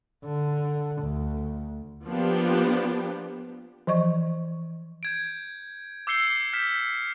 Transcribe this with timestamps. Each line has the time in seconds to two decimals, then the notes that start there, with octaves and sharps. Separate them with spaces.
0.25 D3
1.03 D2
2.05 F3 A#3 B3 D4 G4
3.87 E3 F3 D#5 C#6
5.03 G6 G#6 D7
6.07 D6 E6 G6 C7 C#7 G7
6.53 F6 G6 B6 E7